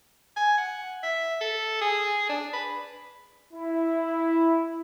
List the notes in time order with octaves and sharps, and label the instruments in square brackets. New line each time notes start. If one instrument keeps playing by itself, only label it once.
[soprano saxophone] G#5
F#5
E5
A4
G#4
D4
B4
[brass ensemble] E4